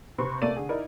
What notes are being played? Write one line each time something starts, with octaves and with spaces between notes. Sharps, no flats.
C3 C4 B4 C6 C#6
C3 A3 A#3 D5 D#7
D3 G#4
D#4 E4 A#4 D5